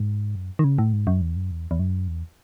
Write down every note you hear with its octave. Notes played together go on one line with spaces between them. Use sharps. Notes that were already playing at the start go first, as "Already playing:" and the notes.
Already playing: G#2
F#2
D#3
C#3
A2
G#2
F#2
E2
F#2
E2
E2
F#2
E2